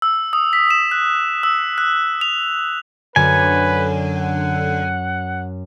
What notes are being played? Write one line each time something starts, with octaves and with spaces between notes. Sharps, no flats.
E6
D#6
B6
E7
F#6
E6
F#6
F7
F#2 D3 B4 G#5
F#5